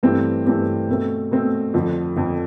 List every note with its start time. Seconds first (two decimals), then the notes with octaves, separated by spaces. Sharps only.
0.03 G2 E3 A3 C4 G4
0.46 G2 E3 A3 C4 G4
0.89 B2 A3 C4
1.31 B2 A3 C4
1.74 F2 D3 F3
2.16 F2 D3 F3